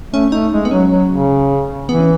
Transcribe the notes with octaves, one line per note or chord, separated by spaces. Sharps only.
A3 C#4
A3 D#4
G#3
B3
F#3 C#4
F#3
C#3
E3 B3
C#4